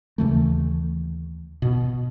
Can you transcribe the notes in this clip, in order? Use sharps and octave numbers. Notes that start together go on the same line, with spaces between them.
D#2 C#3 E3 A3
B2